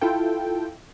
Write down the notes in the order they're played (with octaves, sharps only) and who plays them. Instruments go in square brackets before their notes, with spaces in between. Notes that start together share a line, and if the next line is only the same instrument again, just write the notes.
[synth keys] E4 F4 A4 G5